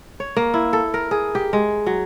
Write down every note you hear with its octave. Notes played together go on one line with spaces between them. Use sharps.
C#5
A#3
E4
A4
A#4
G#4
G4
G#3
F#3